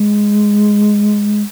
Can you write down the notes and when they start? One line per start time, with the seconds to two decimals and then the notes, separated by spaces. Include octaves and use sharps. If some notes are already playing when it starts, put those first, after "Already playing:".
Already playing: G#3